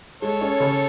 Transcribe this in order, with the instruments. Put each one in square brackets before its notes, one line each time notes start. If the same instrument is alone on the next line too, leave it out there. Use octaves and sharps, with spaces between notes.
[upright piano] G#3 [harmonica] A4 C#5
[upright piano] C#4
C#3